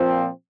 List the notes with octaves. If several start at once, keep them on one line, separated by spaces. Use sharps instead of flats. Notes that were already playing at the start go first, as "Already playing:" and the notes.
Already playing: A#2 F3 C4